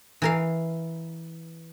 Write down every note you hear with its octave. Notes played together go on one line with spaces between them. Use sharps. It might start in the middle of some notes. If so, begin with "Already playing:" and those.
E3 A#4 F5